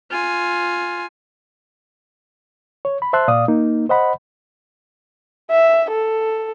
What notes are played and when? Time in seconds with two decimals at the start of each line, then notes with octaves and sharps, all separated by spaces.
0.11 F4 G#5
2.85 C#5
3.02 B5
3.13 C5 E5 A5 C6 F#6
3.28 A#2 D5 F5 D#6
3.48 A#3 D#4
3.89 C5 D#5 F#5 B5
5.51 E5
5.91 A4